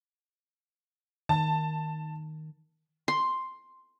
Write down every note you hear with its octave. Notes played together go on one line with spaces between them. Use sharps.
D#3 A5
C6